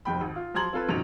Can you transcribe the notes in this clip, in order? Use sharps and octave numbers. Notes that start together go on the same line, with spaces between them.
F1 B1 F2 G5 B5
G#1
F4
F3 F#3 A#5 C6 G#6 F#7
C4 F4 A4 B4
A#1 F#2 B2 D#3 F7